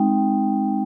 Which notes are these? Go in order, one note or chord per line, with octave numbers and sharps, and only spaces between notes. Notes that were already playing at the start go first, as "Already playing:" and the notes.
Already playing: G#3 C4 D#4 G5